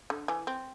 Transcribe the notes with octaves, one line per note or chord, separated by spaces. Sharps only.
D3
E3
C4